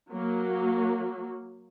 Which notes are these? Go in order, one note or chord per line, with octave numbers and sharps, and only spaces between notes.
F#3 A#3